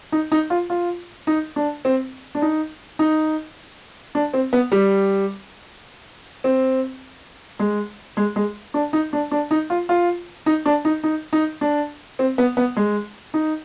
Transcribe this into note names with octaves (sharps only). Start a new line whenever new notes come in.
D#4
D#4
F4
F4
D#4
D4
C4
D4
D#4
D#4
D4
C4
B3
G3
C4
G#3
G#3
G#3
D4
D#4
D4
D4
D#4
F4
F4
D#4
D4
D#4
D#4
D#4
D4
C4
B3
B3
G#3
D#4